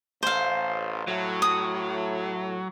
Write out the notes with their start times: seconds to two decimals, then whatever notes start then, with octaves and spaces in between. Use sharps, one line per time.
0.23 A1 C5 F5
1.08 A2 F#3
1.42 D#6